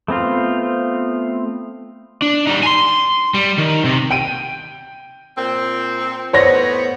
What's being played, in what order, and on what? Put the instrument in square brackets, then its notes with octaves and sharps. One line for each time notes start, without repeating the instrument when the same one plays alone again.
[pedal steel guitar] A3 B3 C4 F4
[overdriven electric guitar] D4
G3 D#4
G#5 C6
G3
D#3
C3
[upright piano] G5 D7 D#7
[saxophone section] A#2 C4
[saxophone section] A2 B3 [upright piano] C5 C#5 A#6